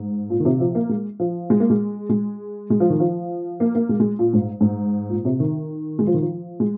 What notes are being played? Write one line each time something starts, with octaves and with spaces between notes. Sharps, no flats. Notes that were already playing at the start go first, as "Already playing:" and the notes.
Already playing: G#2
A#2
D#3
C3
F3
A#3
G#3
F3
G#3
A#3
G#3
G#3
G#3
F3
D#3
F3
A#3
A#3
G#3
G#3
A#2
G#2
G#2
A#2
C3
D#3
G#3
F3
D#3
F3
G#3